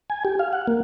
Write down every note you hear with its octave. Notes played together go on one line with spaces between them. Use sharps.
G#5
G4
F5
F#5
A#3